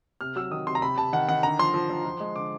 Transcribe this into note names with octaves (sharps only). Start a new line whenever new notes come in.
C3 F6
F#3 E6
D#3 D#6
C3 C6
A#5
C3 B5
C3 A5
D#3 F#5
D#3 F#5
D3 A#5
F3 C6
F3
F3
F3
G#3
D3 D6